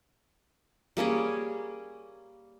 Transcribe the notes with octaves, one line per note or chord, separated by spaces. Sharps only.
G3 A#3 C#4 G#4